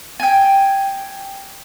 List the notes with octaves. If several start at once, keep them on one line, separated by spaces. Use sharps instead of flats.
G5 G#5